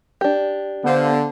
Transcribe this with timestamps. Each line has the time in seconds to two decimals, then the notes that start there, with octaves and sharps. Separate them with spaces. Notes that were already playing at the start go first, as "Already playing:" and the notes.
0.21 D4 G4
0.84 D3 B3 C5 F5